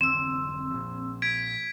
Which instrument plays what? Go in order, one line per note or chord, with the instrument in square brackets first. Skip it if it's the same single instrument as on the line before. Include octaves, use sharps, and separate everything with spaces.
[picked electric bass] F1 D3 E3 [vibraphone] C4 E6
[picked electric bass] A#2 F3
[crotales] G#6 B6 D7